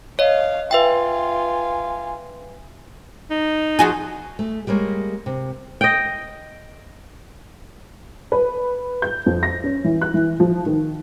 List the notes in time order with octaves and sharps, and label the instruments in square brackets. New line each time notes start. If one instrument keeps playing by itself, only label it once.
[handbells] C#5 D#5 [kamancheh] F5
[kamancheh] F4 G#5 [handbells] B4 E5 G5
[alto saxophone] D#4
[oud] F3 F#4 G#4
[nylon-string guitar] A3
G3 G#3 A#3 C#5
C3
[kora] D#5 G5
[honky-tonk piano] B4
G6
F2
A#6
C#4
E3
F#6
E3
F3
D#3